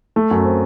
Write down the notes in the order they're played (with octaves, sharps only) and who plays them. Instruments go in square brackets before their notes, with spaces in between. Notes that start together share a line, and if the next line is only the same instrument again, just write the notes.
[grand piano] A3
F#2
C4